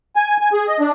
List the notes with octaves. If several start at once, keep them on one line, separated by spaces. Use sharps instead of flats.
G#5
G#5
G#4
D#5
D4